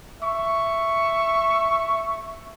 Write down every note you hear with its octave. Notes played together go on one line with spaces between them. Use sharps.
E5 C#6